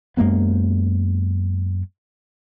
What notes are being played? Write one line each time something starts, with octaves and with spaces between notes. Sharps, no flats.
F#2 G#3 A#3 B3